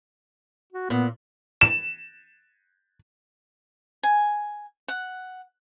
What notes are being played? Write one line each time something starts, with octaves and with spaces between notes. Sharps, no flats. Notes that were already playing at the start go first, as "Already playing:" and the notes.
F#4
A#2 B3
E7
G#5
F#5